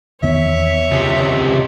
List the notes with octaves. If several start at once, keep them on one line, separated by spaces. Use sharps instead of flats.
E2 D#3 B3 C#5 E5
C#2 C3